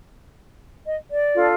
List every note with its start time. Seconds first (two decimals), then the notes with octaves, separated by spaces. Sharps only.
0.87 D#5
1.11 D5
1.35 D4 F4 A4